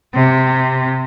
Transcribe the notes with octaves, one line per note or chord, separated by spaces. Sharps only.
C3